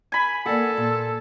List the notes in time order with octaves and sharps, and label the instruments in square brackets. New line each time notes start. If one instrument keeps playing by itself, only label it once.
[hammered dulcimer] G#5 B5
[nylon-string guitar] A#3 D5 F#5 [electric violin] A4
[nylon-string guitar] A#2